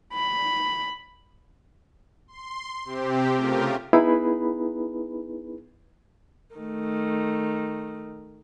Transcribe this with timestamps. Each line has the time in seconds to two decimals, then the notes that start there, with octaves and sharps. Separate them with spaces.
0.13 B5
2.28 C6
2.85 C3 C4 G4
3.34 C#3 A3 F4 G4 A#4
3.93 B3 D#4 E4 G#4 B4 B5
6.56 D#3 A3